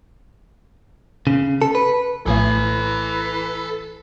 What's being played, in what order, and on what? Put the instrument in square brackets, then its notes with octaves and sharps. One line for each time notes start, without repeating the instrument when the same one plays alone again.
[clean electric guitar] C#3
A4
B4
[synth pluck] A#1 A2 A3 [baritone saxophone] E3 [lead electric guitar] A4 G#5